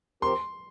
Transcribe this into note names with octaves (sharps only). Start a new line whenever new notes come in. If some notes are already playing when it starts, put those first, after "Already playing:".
F3 C4 G4 A#4 C6